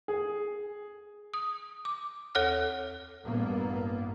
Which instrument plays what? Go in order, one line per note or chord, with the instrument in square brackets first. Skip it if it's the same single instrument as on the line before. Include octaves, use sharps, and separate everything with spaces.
[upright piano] G#4
[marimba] D#6
D6
D#2 A4 C#5 F#5 F6
[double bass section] A1 G2 A#3 B3